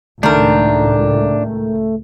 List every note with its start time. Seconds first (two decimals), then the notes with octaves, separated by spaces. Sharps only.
0.23 C#2 A2 D#3 A3 D4 A#4